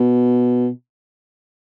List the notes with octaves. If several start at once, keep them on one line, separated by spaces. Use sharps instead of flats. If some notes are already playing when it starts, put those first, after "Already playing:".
Already playing: B2